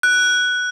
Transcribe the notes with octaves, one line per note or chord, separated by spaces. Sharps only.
F#6